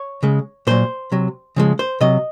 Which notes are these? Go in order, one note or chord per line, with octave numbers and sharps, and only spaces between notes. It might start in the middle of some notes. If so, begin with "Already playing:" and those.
Already playing: C#5
C#3 G#3
A#2 F#3 C5
C3 F#3
C#3 F3 G#3
C5
C3 F#3 D#5